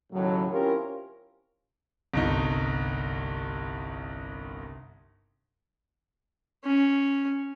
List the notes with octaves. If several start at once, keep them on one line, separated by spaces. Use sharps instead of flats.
D#2 A2 C#3 F#3
C4 C#4 E4 F4 G4 A#4
G1 C2 D#4
C#4